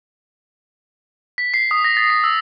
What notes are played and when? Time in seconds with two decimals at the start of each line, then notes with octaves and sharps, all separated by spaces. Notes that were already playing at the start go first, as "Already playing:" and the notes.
1.38 B6
1.54 C7
1.71 D#6
1.84 A#6
1.97 A6
2.10 C7
2.24 E6